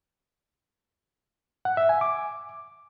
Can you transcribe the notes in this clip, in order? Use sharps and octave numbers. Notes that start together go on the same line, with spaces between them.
F#5
E5
G#5
D6